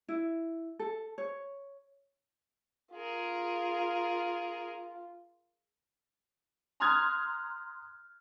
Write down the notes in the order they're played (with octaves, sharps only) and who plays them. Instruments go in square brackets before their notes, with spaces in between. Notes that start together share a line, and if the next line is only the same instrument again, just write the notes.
[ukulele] E4
A4
C#5
[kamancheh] F4 [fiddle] G#4 A#4
[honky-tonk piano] A#5 C6 D#6 F6 F#6 G#6